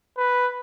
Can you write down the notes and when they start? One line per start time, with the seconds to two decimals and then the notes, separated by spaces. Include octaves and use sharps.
0.17 B4